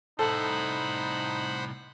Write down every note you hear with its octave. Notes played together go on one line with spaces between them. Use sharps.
C2 A2 D#4 A4 C5 F#5 B5